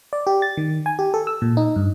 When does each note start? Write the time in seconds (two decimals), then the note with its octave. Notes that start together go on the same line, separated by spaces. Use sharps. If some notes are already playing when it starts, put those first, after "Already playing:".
0.13 D5
0.27 G4
0.42 A6
0.57 D#3
0.86 G#5
0.99 G4
1.14 A4
1.27 E6
1.42 A#2
1.57 D#4
1.76 G2